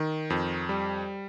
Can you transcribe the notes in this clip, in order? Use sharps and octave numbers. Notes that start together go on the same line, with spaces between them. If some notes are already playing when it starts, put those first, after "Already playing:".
Already playing: D#3
F2
G3